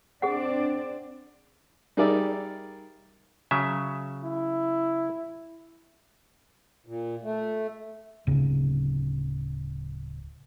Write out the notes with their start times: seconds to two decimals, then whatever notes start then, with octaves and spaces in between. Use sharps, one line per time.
0.22 C4 D4 G#4 D5 F#5
1.97 G3 D#4 G#4 A#4 D5 E5
3.51 C#3 F#3 E5
4.24 E4
6.86 A#2
7.23 A3
8.27 D1 C#3